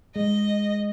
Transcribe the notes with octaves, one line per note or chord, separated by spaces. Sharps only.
G#3 D#5